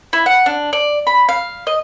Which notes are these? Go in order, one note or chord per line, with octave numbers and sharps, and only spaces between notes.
E4
F#5
D4
D5
B5
F5
D#5